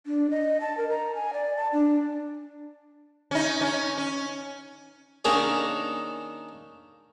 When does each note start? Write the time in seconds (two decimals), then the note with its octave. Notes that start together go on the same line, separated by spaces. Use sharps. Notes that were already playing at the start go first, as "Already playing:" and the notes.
0.07 D4
0.30 D#5
0.61 A5
0.77 A#4
0.90 A#5
1.15 G#5
1.33 D5
1.57 A5
1.73 D4
3.31 C#4 D#4
3.61 C#4
3.98 C#4
5.25 D#3 A#3 C#4 D4 G#4 D5